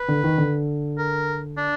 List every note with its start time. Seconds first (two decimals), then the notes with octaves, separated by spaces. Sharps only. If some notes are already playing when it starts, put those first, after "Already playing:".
Already playing: B4
0.08 D3
0.23 D#3
0.38 D3
0.98 A#4
1.57 D4